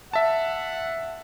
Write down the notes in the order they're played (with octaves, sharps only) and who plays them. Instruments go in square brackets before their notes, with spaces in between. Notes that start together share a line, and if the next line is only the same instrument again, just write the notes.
[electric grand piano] E5 A5 [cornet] F#5